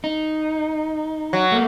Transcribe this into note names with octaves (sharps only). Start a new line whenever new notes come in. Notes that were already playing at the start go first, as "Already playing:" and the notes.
D#4
F#3
A3 A#3